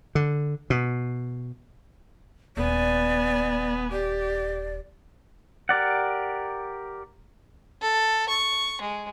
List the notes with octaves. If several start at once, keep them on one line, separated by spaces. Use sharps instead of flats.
D3
B2
D#1 B3 D5 G#5
G4 D5
G4 A#4 D5 F#5
A4
C#6
G#3